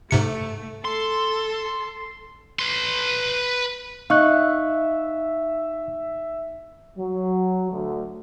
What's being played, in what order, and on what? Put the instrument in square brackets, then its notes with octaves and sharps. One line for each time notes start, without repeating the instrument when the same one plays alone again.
[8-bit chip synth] G#2 C3 C#7 [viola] A3
[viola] A4 [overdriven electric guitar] C6
[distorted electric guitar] B4 C6
[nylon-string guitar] D#4 [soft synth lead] E5 [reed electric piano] F5 C#6 F#6
[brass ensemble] F#3
D2